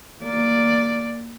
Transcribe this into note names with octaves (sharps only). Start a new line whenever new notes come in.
A#3 D5